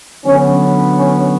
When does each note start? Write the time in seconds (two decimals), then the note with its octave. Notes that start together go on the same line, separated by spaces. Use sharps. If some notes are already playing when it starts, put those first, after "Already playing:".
0.24 D3 F#3 B3 C#4
0.95 C#4